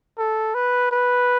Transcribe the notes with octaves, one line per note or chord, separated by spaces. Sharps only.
A4
B4
B4